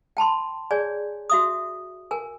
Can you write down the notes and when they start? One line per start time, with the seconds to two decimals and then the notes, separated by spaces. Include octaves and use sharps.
0.17 G5 A5 B5 C6
0.71 G#4 C#5 D5 G#5
1.30 F#4 E5 D#6
2.11 A#4 G#5